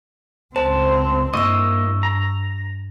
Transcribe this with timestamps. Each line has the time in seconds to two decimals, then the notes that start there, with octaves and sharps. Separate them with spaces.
0.56 C#2 C4 C5 A5
1.34 G2 A#3 E4 D#5 C#6 E6
2.03 A#5